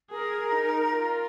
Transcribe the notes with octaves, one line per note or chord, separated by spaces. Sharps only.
G#4 A#4
D#4
F4